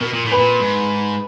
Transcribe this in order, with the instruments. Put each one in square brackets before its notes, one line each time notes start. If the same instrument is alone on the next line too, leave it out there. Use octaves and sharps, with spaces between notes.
[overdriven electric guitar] B2 [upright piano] A#4
[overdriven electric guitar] A#2
A2
[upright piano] B4
[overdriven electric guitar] A#2
G#2